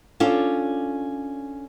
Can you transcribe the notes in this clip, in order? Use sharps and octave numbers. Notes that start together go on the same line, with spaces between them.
C#4 D4 F4 A4 D5